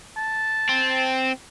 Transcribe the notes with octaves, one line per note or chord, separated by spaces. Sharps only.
A5
C4